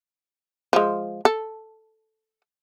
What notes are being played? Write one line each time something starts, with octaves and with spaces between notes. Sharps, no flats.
F3 G#3
A4